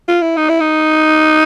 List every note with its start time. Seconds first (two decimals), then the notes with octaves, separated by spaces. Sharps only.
0.08 F4
0.22 E4
0.37 D#4
0.49 E4
0.61 D#4